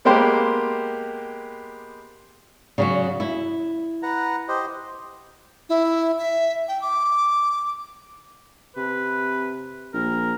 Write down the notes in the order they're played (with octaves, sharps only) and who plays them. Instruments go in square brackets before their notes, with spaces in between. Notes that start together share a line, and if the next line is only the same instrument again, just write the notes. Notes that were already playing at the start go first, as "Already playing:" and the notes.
[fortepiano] G#3 A#3 B3 G4 C5
[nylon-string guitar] C#3 F#3 F#4
E4
[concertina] B4 F#5 A#5
G4 C5 D#5
[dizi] E4
E5
G5
D6
[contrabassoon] C3 [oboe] B4
[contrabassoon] A#1 [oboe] A#4